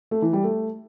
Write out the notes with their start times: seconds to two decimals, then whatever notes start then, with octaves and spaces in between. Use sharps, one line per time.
0.11 A3
0.22 E3
0.33 G3
0.44 A3